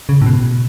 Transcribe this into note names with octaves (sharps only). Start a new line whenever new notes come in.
C#3
A2
B2